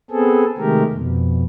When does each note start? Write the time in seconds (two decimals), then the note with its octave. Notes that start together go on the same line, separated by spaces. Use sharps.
0.11 B3 C4 G#4 A4
0.58 C3 D#3 G#3 A3 G4 A#4
0.91 F2 B2